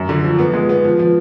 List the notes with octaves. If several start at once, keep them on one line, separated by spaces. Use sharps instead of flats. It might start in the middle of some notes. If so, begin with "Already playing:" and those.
Already playing: F#2
D3
F3
B3
G#3
B3
F3
F3